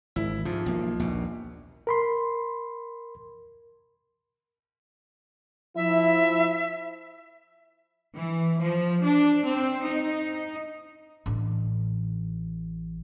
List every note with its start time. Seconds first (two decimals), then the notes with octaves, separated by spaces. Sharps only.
0.16 G#1 E4
0.45 G#2 C3 F3
0.66 B1 A#3
1.00 A#1 D#2 B2
1.87 A#4 B5 C6
5.76 F3 E4 E5
8.15 E3
8.60 F3
9.05 D4
9.48 C4
9.86 D#4
11.26 A1 D4